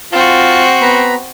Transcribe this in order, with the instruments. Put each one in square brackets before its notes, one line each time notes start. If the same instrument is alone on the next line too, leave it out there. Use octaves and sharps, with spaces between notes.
[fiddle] C4 F#4 [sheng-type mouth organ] F4 A5
[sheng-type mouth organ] B3 A#5 B5